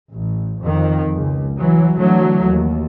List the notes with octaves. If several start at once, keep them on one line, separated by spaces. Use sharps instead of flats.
A1
F2 D#3
C#2
E3 F#3
D3 E3 F#3 A3
D#2